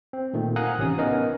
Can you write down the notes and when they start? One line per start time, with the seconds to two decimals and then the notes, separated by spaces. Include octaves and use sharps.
0.13 C4
0.33 A#2 D#3 A3
0.56 F5 F#5 G#5 A#5 D#6 F#6
0.78 A1 C3 C#4 D#6
0.98 B3 C#4 D#4 A#4 D#5